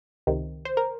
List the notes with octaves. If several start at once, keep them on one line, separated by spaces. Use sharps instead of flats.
C#2 C3 D#3
C5
A#4